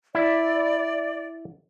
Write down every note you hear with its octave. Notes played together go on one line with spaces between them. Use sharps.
E4 D5 E5